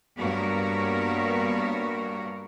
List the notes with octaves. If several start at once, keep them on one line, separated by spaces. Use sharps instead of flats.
G2 A#3 B3 F#4 A#4 C#5